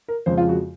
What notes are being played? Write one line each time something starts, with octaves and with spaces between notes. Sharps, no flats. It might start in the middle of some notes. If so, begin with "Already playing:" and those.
A#4
F2 C#3 F3 G#3 C5
F4
F#4